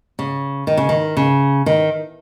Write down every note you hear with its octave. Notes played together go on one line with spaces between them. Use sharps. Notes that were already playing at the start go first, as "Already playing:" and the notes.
C#3
D#3
C#3
D#3
C#3
D#3